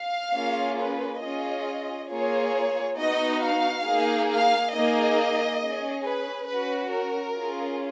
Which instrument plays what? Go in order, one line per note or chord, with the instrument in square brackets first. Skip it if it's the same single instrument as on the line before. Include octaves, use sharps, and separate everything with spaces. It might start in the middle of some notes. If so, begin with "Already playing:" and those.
Already playing: [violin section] F5
A#3 C#4 F4 G#4
B4
C#4 F4 G#4 D#5
A#3 F4 G#4 C#5
B3 D#4 F#4 D#5
F5
A#3 D#4 G#4
F5
A#3 D#4 G#4 D#5
C#4 G#4
B4
C#4 F#4 B4
A#4
C#4 F4 G#4